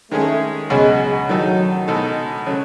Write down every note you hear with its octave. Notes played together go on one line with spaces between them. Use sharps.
D#3 G#3 A3 C#4 G#4
C#2 B2 F#3 G#3 C#4 F#4
D#3 F#3 A3 D#4 A4
B2 G#3 D#4 A4
C#3 F#3 A3 C#4